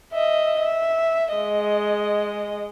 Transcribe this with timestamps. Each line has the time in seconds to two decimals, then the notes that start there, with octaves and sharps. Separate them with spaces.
0.13 D#5 E5
0.60 E5
1.33 G#3 D#5